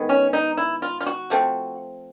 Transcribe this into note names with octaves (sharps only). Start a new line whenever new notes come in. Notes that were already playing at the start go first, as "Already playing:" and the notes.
Already playing: D#3 G#3 B3
C#4
D#4
E4
F4
F4
F#4
F3 A3 C4